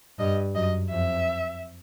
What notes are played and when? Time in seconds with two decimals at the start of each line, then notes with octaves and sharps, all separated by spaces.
0.19 G2 D#5
0.55 F#2 D#5
0.90 F2 E5